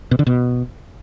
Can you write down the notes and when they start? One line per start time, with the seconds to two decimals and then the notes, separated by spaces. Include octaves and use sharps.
0.11 B2
0.19 D3
0.27 B2